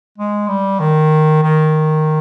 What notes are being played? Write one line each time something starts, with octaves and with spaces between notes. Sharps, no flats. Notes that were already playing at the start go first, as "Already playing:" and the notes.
G#3
G3
D#3
D#3